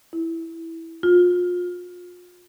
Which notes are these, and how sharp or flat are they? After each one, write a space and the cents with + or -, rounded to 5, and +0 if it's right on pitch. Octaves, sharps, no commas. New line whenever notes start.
E4 -5
F4 +35